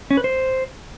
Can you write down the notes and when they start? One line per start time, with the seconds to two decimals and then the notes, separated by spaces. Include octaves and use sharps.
0.11 C#4
0.17 B4
0.24 C5